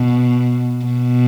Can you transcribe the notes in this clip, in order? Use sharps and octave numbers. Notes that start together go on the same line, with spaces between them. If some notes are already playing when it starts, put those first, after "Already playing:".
Already playing: B2
B2